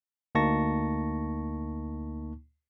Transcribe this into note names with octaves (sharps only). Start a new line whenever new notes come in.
D2 A#3 D#4 A5 C#6 A#6